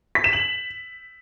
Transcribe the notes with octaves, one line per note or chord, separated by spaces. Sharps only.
B6
E7
F#7